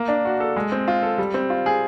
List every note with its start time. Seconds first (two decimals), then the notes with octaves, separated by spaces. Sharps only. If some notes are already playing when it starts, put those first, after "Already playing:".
Already playing: A#3
0.08 D4
0.25 F#4
0.40 A4
0.56 G#3
0.72 C4
0.88 F4
1.02 A4
1.18 G3
1.34 C4
1.50 F4
1.66 G#4